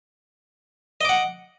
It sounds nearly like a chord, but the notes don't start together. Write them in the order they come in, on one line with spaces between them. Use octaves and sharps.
D#5 D6 F#5